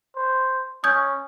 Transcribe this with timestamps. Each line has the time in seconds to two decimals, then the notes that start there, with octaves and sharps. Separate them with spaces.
0.16 C5
0.84 C#4 D#6 G6 G#6